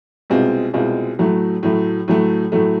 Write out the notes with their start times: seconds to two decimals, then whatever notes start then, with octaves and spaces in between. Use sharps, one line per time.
0.30 C2 B2 G#3 C4 F4
0.74 C2 B2 G#3 C4 F4
1.19 A2 F#3 A3
1.63 A2 F#3 A3
2.08 A2 F#3 A3
2.52 A2 F#3 A3